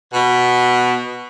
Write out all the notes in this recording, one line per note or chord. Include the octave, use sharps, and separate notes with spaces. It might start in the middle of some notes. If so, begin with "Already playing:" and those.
B2